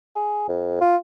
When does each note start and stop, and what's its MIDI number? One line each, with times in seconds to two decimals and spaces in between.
0.16 0.48 68
0.48 0.77 41
0.81 0.96 65